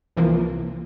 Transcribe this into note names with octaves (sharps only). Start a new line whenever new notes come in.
C2 E3 F3 A#3